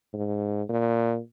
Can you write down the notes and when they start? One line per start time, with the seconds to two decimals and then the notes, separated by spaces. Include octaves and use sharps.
0.13 G#2
0.69 A#2